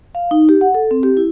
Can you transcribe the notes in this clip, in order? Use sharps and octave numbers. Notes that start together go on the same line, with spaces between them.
F5
D#4
G4
F#5
A4
C4
G4
E4